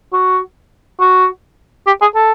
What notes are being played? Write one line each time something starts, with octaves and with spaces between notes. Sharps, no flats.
F#4
F#4
G4
G#4
A4